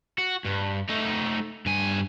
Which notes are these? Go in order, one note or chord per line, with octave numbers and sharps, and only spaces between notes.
F#4
G2
A3 D#4
G2 G#5